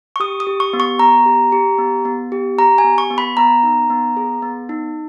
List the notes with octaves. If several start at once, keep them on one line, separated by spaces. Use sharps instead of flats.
C#6
G4 D#6
D#6
G4
C#6
B3
C#6
B3 A#5
G4
G4
B3
B3
G4
G4 A#5
G#5
B3
C#6
B3
B5
B3 A#5
D#4
B3
G#4
B3
D#4